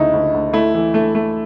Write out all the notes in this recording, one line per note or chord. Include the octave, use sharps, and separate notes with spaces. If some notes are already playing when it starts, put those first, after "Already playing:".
Already playing: D2 C#3 D#4 E4
D2
D2
A3 E4
E3
A3
A3